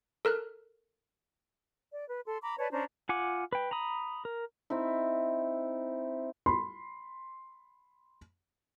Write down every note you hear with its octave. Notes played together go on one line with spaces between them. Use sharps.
A4 A#4 F6 F#6
D5
B4
A4 C6
A#5 B5 D6
B4 C#5 D5 A5
C#4 D4 C5 A#5
F4 F#5 G#5 D6
B4 G5
A#5 B5 D#6
A#4
C4 D#4 E4
B5 C6